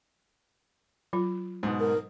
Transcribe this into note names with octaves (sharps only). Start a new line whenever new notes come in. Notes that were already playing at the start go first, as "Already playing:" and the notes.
F#3 F4
G#2 B2
A#4